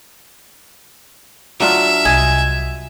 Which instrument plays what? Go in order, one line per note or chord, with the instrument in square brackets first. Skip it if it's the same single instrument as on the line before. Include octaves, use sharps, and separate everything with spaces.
[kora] F#3 D4 F4 [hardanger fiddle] E5
[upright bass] C2 [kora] D#5 [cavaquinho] G#5